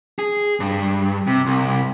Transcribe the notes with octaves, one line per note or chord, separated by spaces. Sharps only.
G#4
G2
C3
C2